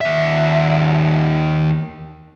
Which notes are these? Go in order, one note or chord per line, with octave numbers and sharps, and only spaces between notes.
D#2 E5